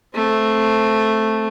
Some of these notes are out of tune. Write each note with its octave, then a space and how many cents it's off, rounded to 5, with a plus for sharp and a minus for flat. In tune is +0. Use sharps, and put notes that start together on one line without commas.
A3 +0 C4 +0